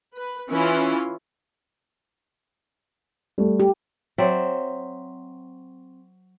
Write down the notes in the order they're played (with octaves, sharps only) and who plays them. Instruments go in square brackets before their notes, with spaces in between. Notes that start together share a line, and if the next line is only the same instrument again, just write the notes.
[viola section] B4
E3 C#4 E4 F4
[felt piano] G3 A3
[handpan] G4
[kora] F#3 C4 D5 E5